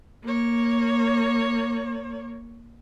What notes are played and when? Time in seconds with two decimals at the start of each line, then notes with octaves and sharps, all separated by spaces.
0.24 A#3 C#5